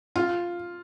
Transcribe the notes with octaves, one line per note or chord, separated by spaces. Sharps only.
F4